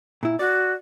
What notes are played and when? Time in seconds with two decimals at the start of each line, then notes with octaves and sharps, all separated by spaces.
0.23 A#2 E4
0.39 F#4 D5